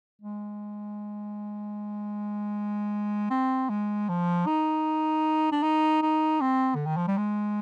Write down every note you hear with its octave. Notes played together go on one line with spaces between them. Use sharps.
G#3
C4
G#3
F3
D#4
D4
D#4
D#4
C4
D3
D#3
F3
G3
G#3